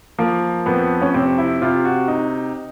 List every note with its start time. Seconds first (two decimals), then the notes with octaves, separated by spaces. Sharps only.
0.18 F3 A#3
0.66 F2 B3
1.01 C#4
1.14 C3 C4
1.38 E4
1.62 C3 F4
1.85 F#4
2.08 D#4